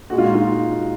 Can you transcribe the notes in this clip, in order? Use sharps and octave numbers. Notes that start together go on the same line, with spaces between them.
A#2 G#3 F#4
F4
D#4
F4